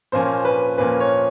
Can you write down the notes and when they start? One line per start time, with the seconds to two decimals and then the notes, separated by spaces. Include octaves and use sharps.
0.12 A#2 F3 A#3 C#4 C5
0.45 B4
0.78 A#2 F3 A#3 C#4 B4
1.00 C#5